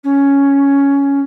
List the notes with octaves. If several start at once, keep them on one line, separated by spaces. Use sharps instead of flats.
C#4